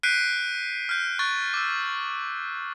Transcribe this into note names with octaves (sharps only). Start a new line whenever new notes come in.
F#6 G6 B6 C7 D7 D#7
F6 G6
C#6 F#6 A6
D6 E6